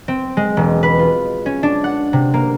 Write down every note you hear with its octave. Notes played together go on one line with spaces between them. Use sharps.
C4
G#3
E1
B4
F4
C#4
D4
F#5
C3
A#3